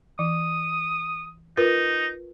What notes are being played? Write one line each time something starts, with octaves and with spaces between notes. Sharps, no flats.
E3 D#6
D#4 F4 A#4 B4